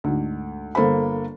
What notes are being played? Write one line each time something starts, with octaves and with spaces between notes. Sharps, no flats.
D2 G#2
G1 A#3 A4 C5 B5